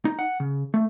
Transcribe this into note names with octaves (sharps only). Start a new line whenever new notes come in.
D#4
F#5
C#3
A3